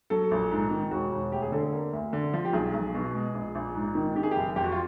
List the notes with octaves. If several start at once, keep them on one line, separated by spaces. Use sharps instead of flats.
F#3 A4
A#1
G#2
D#3
E1 F#4
E1
D2 G4
G#4
D3 A4
A#3
D2
D3
F3
G4
B1 G#4
B1
B2
G#3
A#1
A#1
G#2
D#3
D#3 G4
G#4
F#1 G4
F2 G4
F#4
F4